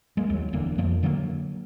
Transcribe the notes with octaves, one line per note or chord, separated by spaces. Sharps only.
G#3 A#3
D#2 F#3
E1 E2 D3 A#3
F2 F3 A#3
D3 F#3 A3 A#3